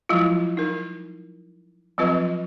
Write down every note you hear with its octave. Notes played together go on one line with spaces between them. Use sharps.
F3 F#3 G#3 E4 F4
D#4 A#4
F3 F#3 C4 F4 B4